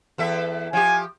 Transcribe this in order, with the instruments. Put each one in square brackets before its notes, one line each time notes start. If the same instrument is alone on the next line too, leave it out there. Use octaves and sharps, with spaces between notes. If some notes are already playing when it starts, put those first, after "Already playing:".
[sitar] E2 A4 E5
[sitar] F3 G4 [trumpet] G#5